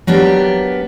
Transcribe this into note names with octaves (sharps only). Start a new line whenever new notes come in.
F#3 A#3 B3 D4 G4